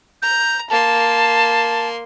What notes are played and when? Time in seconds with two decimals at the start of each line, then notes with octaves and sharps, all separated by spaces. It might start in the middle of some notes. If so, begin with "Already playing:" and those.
0.22 A#5 G6
0.70 A#3 A5 C6